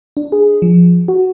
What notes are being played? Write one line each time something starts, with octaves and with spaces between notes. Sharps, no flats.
D4
G#4
F3
F#4